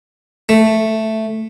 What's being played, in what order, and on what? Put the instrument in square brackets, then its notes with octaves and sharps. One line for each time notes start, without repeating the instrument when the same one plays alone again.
[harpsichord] A3